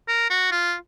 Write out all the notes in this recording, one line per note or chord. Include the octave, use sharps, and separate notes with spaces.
A#4
F#4
F4